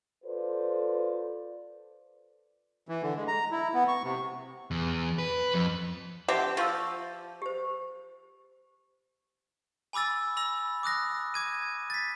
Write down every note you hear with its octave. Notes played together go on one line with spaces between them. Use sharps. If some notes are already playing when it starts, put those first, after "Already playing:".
F4 A4 B4 C5 D5
E3
D3
G#3
A#5
E4
B3
C#6
C3
E2
B4
F2
D3 C4 G4 D5 E5 F#5
F3 G4 C6 E6
G4 C5
G#5 B5 D6 E6 A6
B5 E6 A#6
D6 D#6 F#6 A#6
D6 G#6 D#7
A6 B6